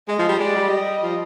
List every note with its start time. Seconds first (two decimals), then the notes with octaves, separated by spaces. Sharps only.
0.08 G#3 D#5
0.19 F3
0.29 G3
0.40 G#3 D5
0.55 G3
0.71 D#5
1.03 F3